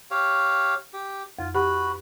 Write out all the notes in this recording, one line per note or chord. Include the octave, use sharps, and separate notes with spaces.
G4 C#5 F5
G4
F2 F4
F#4 G4 B4 F#5 B5